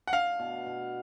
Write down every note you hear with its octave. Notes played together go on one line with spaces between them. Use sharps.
F#5
D4 F5
B2
B2